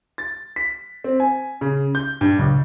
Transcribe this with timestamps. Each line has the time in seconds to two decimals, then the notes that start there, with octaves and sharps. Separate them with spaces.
0.18 A6
0.56 B6
1.04 C4
1.20 G#5
1.61 C#3
1.95 G6
2.21 G2
2.39 C#2